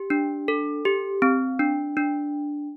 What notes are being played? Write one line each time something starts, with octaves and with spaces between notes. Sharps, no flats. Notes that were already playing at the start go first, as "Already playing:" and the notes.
Already playing: G4
D4
A4
G4
C4
D4
D4